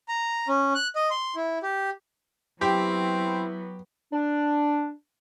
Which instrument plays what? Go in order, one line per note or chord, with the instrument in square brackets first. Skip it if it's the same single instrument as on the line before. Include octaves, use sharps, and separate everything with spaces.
[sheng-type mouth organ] A#5
C#4
F#6
D#5
C6
E4
G4
[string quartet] F#3 B3 [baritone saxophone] C4 [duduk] E4 [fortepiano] G4
[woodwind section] D4